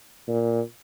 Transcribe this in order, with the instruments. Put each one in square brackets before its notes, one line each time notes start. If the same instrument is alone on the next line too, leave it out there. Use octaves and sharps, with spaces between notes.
[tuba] A#2